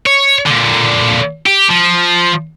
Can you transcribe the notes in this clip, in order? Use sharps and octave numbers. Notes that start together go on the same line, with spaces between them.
C#5
A#2 D3
G4
F3